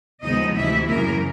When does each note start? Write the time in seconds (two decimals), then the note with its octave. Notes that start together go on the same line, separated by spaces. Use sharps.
0.23 D#2 C#3 F3 G#3 B3 D#4 D#5
0.56 D2 C3 E3 E4 E5
0.88 F#2 C#3 E3 A#3 A#4